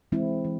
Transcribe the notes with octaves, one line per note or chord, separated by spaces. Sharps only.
E3 G#3 C4 E4
E3